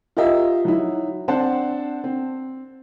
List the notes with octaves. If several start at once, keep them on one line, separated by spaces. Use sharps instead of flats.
F4 G4 A#4 D#5 E5
F#3 D#4 E4
C4 D4 C5 F#5 A5
C4